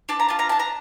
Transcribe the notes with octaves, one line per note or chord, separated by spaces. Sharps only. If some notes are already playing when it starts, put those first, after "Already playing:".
D4 A5
A#5
F4 A5
A#5
D4 A5
A#5